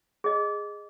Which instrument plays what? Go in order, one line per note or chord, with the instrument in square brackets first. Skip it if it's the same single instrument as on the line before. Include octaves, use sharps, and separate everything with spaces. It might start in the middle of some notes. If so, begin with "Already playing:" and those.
[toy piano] G#4 D#5